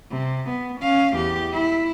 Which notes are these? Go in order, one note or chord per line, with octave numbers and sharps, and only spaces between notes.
C3
B3
C#4 F5
E2 G4
E4